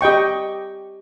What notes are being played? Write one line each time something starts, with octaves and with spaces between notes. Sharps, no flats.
G4 D#5 G5 C#6